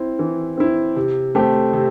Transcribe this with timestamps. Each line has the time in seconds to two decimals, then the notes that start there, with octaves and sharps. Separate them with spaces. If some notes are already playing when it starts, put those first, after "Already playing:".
Already playing: C4 E4
0.19 E3
0.57 C4 E4
0.96 C3
1.35 A3 C4 G4
1.73 C3